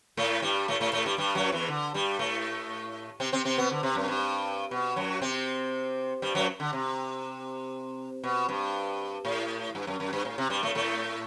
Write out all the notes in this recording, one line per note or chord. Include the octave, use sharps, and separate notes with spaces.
A2 A3
G2 G3
A2 A3
A2 A3
A2 A3
G2 G3
G2 G3
F#2 F#3
E2 E3
D3
G2 G3
A2 A3
C3 C4
C3 C4
C3 C4
B2 B3
D3
C3
F#2
G2
B2
F#2 F#3
C3 C4
G2 G3
F#2 F#3
D3
C3
B2
G2
A2
G2
F#2
F#2
G2
A2
C3
G2 G3
A2 A3
A2 A3